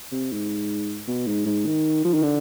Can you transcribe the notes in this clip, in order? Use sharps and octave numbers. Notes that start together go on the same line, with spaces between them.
C3
G#2
B2
G#2
G#2
D#3
F3
D#3
D3